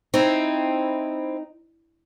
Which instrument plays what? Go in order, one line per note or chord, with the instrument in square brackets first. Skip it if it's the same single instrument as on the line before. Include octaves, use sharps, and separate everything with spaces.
[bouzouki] C4 E4 [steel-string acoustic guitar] D#4